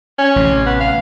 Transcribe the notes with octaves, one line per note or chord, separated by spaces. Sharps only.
C#4
A1 C3
B3
F5